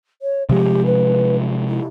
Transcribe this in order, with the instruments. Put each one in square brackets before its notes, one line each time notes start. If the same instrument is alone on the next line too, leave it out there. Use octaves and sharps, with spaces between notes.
[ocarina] C#5
[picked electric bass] C3 F3 G#3 [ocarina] G4
[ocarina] B4
E4